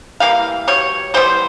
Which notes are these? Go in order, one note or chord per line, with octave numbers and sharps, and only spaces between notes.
E3 G3 A#3 F5
B2 G3 C#5
E3 G3 B3 C5